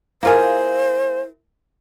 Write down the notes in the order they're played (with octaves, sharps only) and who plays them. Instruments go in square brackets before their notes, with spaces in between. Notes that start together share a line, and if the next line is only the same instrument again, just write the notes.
[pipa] A#3 F4 G#4 [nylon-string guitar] E4 A#4 [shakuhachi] C5